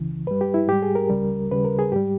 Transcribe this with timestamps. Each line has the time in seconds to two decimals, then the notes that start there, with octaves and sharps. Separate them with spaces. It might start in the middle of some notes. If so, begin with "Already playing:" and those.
Already playing: C#2 C#3 E3
0.27 G2 G3 B4
0.41 G4
0.54 E4
0.68 G#2 G3 G4
0.82 G#4
0.95 A#4
1.10 C#2 C#3 G3
1.50 D#2 C#3 G3 B4
1.65 A#4
1.79 G#4
1.92 G#2 G3 G4